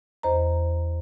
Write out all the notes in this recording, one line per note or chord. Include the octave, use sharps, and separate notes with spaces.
E2 C5 D#5 A#5